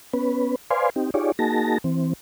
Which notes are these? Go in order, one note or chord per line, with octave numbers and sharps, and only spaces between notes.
B3 C#4 B4
B4 C5 D5 F5 G#5 C6
C4 D#4 G4
D#4 F4 G4 G#4 C#5 D5
A#3 D#4 F#4 G#4 A5 A#6
E3 C4